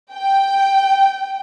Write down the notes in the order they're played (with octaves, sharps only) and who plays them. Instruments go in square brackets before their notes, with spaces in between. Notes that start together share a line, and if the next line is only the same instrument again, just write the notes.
[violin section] G5